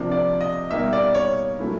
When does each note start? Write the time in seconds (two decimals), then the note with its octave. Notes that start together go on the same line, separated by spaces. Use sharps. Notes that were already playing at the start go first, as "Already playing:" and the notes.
Already playing: C3 F3 A#3 D4
0.12 D5
0.41 D#5
0.70 B2 G3 A#3 D#4 E5
0.93 D5
1.14 C#5
1.59 A#2 F#3 A3 C#4 E4